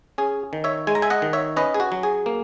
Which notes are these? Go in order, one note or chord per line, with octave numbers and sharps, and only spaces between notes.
C#4 G#4
D#3
C#5 E5
G#3 G#5
A#5
E5 G#5
D#5 F#5
D#3
C#5 E5
C#4 B4 D#5
G#4
F#4
F#3
G#4
A#3